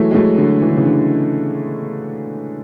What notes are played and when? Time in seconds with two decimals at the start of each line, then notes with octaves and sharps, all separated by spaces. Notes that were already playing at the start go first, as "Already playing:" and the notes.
Already playing: E3 F#3 G#3 A3
0.11 G#3
0.14 F#3 A3
0.38 D3 F#3
0.62 E3
0.69 D3
0.77 C#3 E3
0.85 D3